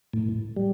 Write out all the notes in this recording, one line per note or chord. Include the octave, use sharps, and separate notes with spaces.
A2
G3